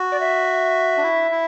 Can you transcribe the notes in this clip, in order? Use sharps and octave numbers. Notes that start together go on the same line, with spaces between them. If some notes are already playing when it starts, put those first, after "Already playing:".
Already playing: F#4
D5
E5
D4
E4
E4